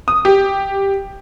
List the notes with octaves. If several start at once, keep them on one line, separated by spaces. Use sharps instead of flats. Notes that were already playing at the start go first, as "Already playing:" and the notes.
D#6
G4